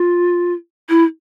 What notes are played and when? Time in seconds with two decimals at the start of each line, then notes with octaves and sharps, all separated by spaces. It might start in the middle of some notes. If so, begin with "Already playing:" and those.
Already playing: F4
0.90 E4